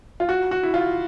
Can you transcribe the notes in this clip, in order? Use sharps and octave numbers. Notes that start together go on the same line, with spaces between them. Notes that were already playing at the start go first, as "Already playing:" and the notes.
F4
F#4
F#4
E4
F4